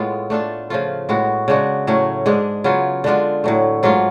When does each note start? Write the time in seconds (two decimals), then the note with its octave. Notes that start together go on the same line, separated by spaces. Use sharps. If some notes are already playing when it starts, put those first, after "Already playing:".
Already playing: A2 G#3 B3 F4
0.30 A3 D4 F4 A4
0.70 C#3 F3 A3 F4
1.09 A2 G#3 B3 F#4
1.48 C#3 G#3 D4 F#4
1.87 A2 F#3 A3 C#4
2.26 G#2 G#3 D4 G#4
2.64 C#3 F#3 B3 F4
3.04 D3 G#3 D4 F4
3.44 A2 F#3 A3
3.83 G#2 F#3 A3 F4